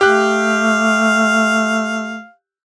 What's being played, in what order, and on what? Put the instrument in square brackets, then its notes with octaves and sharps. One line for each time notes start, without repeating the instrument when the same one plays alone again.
[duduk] A3 [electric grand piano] G4 F#6 [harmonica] F5